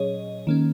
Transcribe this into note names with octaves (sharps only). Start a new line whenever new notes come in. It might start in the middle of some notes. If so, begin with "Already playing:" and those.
Already playing: A#2 F#3 C#4 G#4 C#5 D#5
D#3 A#3 C#4